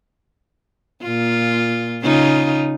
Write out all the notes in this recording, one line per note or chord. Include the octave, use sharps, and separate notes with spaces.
A#2 F4
C#3 D#4 F4